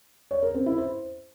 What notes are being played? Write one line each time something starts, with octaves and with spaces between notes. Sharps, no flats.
C#5
A#4
C4
E4
C5